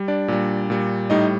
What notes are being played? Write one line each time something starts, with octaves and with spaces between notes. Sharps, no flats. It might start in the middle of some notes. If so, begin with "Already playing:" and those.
Already playing: G3
D4 D5
A#2 G3
A#2 G3
A2 G3 D#4 D#5